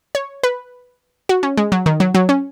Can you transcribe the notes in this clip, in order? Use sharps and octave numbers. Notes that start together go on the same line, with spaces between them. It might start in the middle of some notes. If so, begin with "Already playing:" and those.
C#5
B4
F#4
C#4
G#3
F#3
D#3
F#3
F#3
C#4